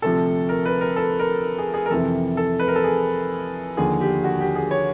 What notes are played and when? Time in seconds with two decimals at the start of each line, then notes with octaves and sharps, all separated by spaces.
0.02 D2 C3 F3 A4
0.49 A#4
0.66 B4
0.81 A#4
0.96 A4
1.19 A#4
1.58 G#4
1.74 G#4
1.86 A#4
1.90 F2 C3 E3 A4
2.37 A4
2.59 B4
2.68 A#4
2.76 A4
2.84 G#4
3.77 D#2 D3 F3 G#4
4.01 G4
4.24 F#4
4.40 G4
4.56 G#4
4.71 C#5